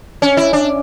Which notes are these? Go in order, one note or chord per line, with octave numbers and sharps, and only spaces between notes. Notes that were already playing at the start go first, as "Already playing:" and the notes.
C#4
E4
D4